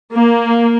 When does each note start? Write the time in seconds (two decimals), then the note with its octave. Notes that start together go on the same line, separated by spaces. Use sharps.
0.12 A#3